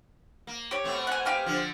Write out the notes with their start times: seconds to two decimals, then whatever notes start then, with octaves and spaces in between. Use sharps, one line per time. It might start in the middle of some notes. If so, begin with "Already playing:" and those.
0.47 A#3
0.71 G4 C#5
0.84 B2 A3 C4
1.07 F#5 G#5
1.25 G4 F5 G#5
1.46 D3 F3